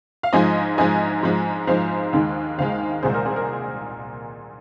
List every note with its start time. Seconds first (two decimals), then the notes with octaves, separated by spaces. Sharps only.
0.23 F5
0.33 G#2 F3 G#3 D#5 G#5
0.78 G#2 F3 G#3 D#5 G#5
1.23 G#2 F3 G#3
1.67 G#2 F3 G#3 C5 F5
2.13 D#2 D#3 G#3
2.58 D#2 D#3 G#3 C5 F5
3.02 C2 A#2 G#3 G#4 C5
3.14 A#4
3.26 G#4
3.36 A#4